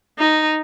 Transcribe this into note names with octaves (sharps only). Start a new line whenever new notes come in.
D#4